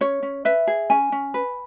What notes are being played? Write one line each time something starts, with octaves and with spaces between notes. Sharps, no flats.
C#4 C#5
C#4
B4 E5
G#4
C#4 G#5
C#4
B4